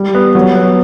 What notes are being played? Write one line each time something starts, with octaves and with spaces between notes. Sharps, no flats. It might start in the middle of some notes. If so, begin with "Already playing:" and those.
Already playing: G3
B3
F#3
B3